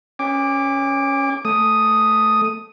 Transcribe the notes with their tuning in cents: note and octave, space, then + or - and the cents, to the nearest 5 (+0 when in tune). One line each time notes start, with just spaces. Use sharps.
C#4 +0 G#5 -40 D6 +0
A3 +0 D#6 +0